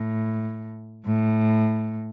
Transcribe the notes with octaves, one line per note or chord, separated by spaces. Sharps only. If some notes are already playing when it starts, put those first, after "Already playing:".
Already playing: A2
A2